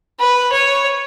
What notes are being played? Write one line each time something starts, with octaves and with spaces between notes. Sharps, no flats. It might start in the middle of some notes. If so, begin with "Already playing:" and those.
B4
C#5